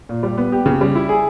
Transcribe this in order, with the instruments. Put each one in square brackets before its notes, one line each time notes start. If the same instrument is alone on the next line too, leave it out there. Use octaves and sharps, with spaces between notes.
[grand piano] A#2
G3
B3
G4
C#3
G3
E4
G#4